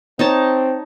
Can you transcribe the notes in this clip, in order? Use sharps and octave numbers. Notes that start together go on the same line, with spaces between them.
C4 D#4 C#5 A5